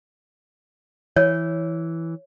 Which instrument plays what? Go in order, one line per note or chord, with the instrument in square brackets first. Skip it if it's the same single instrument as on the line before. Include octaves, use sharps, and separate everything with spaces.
[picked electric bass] E3 [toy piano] C#5